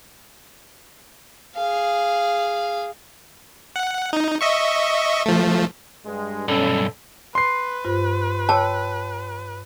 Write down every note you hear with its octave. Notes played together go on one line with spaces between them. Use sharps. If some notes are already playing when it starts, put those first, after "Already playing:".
G#4 F5
F#5
D#4
D#5 E5 C#6
F3 A3
G2 G#3
B1 G2 C#4 A4
B4 C6 C7
G2 F4 C5
C#5 G5 A5 E6